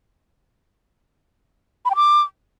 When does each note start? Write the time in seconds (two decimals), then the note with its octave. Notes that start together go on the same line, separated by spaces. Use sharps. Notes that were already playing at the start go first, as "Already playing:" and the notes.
1.85 B5
1.90 G5
1.96 D6